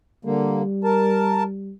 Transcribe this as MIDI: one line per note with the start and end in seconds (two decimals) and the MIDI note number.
0.25 0.62 50
0.25 1.73 55
0.25 0.62 58
0.84 1.43 70
0.84 1.43 81